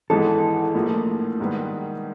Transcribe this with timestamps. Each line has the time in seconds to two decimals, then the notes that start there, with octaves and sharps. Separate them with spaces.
0.10 G#1 G#2 E3 G#3 B3 A4
0.74 A#1 A2 F3 A#3
1.40 G#2 D#3 G3 B3